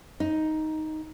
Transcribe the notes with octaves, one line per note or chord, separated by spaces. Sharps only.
D#4